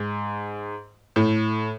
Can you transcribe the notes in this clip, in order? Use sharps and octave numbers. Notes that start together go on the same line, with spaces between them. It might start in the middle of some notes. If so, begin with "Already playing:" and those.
Already playing: G#2
A2